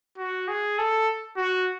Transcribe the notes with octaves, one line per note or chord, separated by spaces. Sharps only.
F#4
G#4
A4
F#4